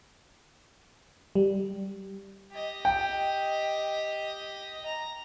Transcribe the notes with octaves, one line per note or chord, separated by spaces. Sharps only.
G3
G4 D#5
G5
A#5